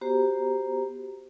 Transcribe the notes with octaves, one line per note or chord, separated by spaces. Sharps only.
B3 F#4 G4 C5 A#5